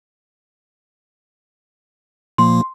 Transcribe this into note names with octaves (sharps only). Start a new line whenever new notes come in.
A#2 F3 A#3 C6